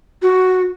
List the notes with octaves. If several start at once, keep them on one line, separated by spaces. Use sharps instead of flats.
F#4